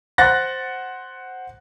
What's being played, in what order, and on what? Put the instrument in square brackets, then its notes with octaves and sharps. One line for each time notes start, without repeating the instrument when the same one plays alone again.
[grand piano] C5 F#5 F#6 A6 A#6